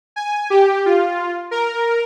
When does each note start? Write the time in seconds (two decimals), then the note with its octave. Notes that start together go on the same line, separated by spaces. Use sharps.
0.16 G#5
0.50 G4
0.86 F4
1.51 A#4